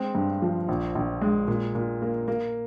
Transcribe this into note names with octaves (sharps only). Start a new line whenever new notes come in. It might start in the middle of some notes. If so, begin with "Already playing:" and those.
Already playing: G#3 C4
G2
F3
A#1
A#1
G#3
A#2
A#2
A#3
A#3